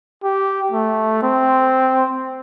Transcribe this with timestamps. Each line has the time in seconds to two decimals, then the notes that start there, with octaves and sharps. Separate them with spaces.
0.24 G4
0.72 A3
1.22 C4